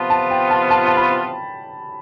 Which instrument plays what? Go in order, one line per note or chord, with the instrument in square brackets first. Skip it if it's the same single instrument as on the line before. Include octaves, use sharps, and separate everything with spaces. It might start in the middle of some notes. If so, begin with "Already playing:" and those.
Already playing: [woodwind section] C3 F3 B3 F4 [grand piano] A5
[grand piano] A5
G5
A5
A5
A5
B5